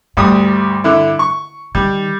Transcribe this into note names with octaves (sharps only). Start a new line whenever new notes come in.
D2 G2 G3 D#6
D3 E4
C#6
D#3 G3